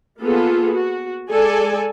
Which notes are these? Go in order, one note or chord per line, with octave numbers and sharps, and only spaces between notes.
A#3 B3 F4 G#4 A4
F#4
G#3 A4 D5 G#5